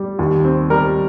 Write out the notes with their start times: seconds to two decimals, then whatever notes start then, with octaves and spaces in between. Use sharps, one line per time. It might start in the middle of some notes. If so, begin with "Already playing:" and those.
Already playing: G3
0.19 D#2
0.44 C4
0.70 G3 A#4